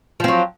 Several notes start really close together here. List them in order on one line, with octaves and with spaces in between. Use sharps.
F3 C4 F#3